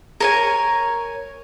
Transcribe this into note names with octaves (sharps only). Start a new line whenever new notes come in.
A#4 C#5 G#5